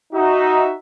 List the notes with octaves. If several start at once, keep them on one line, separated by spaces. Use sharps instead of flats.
D#4 F#4 E5